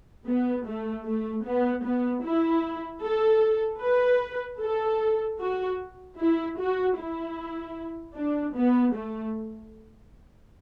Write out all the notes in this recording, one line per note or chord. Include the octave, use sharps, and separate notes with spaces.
B3
A3
A3
B3
B3
E4
A4
B4
A4
F#4
E4
F#4
E4
D4
B3
A3